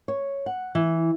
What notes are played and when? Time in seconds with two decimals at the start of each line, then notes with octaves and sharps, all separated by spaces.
0.08 C#5
0.46 F#5
0.75 E3